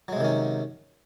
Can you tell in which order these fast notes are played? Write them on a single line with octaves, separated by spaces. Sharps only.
F#3 G#3 C3 D#3 C#4